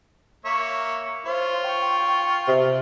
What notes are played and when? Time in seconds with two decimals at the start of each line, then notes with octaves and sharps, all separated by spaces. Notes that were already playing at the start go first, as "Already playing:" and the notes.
0.45 A#3 C#5 E5
1.26 F4 C5 C#5
1.64 G5 C#6
2.48 C3